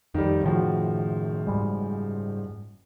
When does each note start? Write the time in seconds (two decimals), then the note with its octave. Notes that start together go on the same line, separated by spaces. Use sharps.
0.14 F2 D#3 G3
0.44 F#1 A2 D#3 F3 F#4
1.47 G#2 G3 G#3